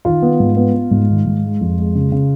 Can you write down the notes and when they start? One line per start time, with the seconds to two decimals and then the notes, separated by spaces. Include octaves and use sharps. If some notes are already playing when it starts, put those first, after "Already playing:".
0.05 D#3 F4
0.22 B3
0.40 G#2
0.56 B3
0.74 B3
0.91 G#2
1.09 D#3
1.26 G#2
1.44 G#3
1.61 F2
1.78 G#3
1.95 C#3
2.12 C#3